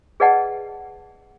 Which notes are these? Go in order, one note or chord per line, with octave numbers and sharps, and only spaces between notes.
G#4 B4 D5 D#5 F#5 A5